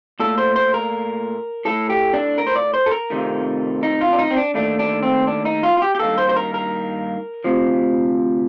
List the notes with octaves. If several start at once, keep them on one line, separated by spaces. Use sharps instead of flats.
A#2 A3 A4
C5
C5
A#4
A2 A3 A4
G4
D4
A#4
C5
D5
C5
A4
A#4
F2 C3 D#3 A3
D#4
F4
D4
D#4
C4
D4
D#2 D#3 A3 D4
D4
C4
D4
D#4
F4
F4
G4
G4
G2 D#3 A#3 A4
C5
C5
A#4
A#4
D2 C3 F3